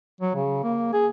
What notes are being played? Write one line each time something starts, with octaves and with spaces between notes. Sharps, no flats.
F#3
C#3
A#3
G#4